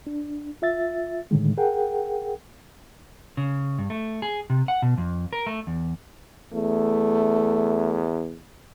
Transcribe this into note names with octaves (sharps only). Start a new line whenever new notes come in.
D4
F4 E5 A6
A2 D3 D#3 G#3
G#4 A#4 F#5 G5
C#3
G2
A3
G#4
C3
F#5
B2
F2
A#4
A3
E2
E2 A3